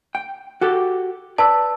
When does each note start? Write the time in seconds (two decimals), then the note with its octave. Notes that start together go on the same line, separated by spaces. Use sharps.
0.15 G5
0.61 F#4 G4 A4
1.38 B4 D5 A5 E6